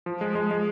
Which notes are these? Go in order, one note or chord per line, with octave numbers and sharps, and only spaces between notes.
F3
G#3
G#3
G#3